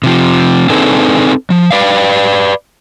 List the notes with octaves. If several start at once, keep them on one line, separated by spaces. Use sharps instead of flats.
C3 F3
C4 D4 D#4 G#4 A4 B4
F3
B4 D5 F5